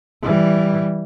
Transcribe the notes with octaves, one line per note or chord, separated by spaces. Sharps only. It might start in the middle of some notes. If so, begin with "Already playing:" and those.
E3 G3